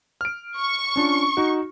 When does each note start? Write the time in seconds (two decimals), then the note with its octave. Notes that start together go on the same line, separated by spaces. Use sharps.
0.21 F6 D7
0.56 C#6
0.96 C#4 D4 F4
1.37 D#4 F#4